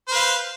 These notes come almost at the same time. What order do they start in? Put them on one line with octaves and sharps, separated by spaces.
C5 B4 F5